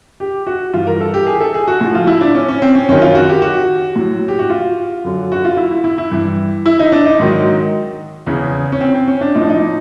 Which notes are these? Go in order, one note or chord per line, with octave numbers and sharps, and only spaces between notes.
G4
F#4
G2 E3 F4
A#4
A4
G4
G#4
A4
G#4
F#4
A2 F3 F#4
F4
E4
D4
C#4
C#4
C4
C#4
F#2 D#3 F#3 C#4
F4
F#4
G4
F#4
A2 F#3
G4
F#4
F4
F#2 D3 F#3
F#4
F4
E4
E4
E4
E4
G2 E3
E4
D#4
D4
D#4
G#2 D#3 F#3
E2 C#3 E3
C#4
C4
C4
C#4
D4
A2 F3 D#4
D4
D#4